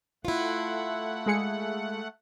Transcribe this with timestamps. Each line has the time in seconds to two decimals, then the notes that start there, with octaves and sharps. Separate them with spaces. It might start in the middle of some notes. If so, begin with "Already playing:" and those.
0.25 A3 E4 F4 F#5
1.26 G#3 G#4 C#7